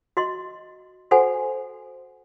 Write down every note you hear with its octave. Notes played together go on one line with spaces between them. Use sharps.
F#4 D#5 C6
F#4 A4 C5 F#5 G#5